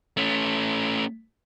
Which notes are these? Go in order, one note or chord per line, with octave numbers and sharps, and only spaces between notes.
A3 C#4